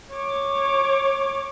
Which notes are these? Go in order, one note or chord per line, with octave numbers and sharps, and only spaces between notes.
C#5 D6